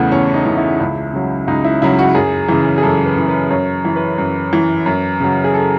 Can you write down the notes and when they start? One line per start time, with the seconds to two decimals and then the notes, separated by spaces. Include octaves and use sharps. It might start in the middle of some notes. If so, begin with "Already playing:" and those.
Already playing: E2 C#3 E3 A3 B3
0.12 E2 C#4
0.34 D#4
0.45 C#3 E3
0.57 E4
0.80 C#2
1.13 C#3 F#3
1.48 C#2 D#4
1.64 E4
1.82 C#3 F#3 E4
1.99 F#4
2.15 F#2 G#4
2.49 C#3 E3
2.78 G#4
2.82 F#2 A4
3.05 B4
3.16 C#3 E3
3.28 B4
3.50 F#2 C#5
3.85 E3
3.96 B4
4.18 F#2
4.53 E3
4.86 F#2
5.20 C#3 F#3
5.44 G#4
5.54 A4